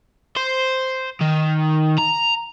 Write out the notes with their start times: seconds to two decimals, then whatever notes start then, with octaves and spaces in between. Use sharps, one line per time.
0.37 C5
1.21 D#3
1.98 A#5